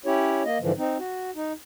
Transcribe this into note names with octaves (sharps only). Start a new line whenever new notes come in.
C#4 E4 G4 C#5
A#3 D#5
G#2 D3 E3 F3
C4 D#4
F#4
D#4